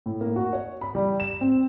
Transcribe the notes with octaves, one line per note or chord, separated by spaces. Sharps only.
A2
A#3
F#4
C#5
B5
G3
E7
C4